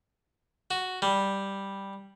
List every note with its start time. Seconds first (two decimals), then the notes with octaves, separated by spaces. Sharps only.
0.71 F#4
1.02 G3